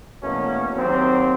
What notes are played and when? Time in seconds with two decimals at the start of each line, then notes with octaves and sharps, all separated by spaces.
0.23 E2 B2 A3 A#3 C#4
0.77 D#2 F#3 C4